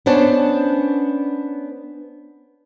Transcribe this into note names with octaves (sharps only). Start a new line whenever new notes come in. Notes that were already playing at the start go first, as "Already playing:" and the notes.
B3 C#4 D4 C5 A5